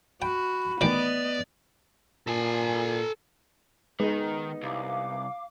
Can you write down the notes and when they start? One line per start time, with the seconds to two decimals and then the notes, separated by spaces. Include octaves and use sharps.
0.22 F#4 G5 B5
0.81 A1 D#3 B3 D5 D#5 G5
2.28 A#2 A4 G#5
4.00 D#3 G#3 B3 D#4
4.63 C2 F5 D6